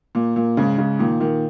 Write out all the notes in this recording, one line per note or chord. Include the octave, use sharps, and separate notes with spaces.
A#2
A#2
G#2 C#3
G#2 C#3
A#2 D#3
A#2 D#3